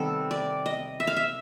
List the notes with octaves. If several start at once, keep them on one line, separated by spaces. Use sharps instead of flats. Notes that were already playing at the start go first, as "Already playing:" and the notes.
Already playing: C3 D#3 G3 B3 A4
D5
D#5
E5
F5
E5